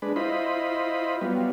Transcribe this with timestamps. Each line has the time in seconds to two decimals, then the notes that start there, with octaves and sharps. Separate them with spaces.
0.02 G#3 D4 B4
0.16 E4 F4 C5 D#5 B5
1.21 F#3 G3 B3 F4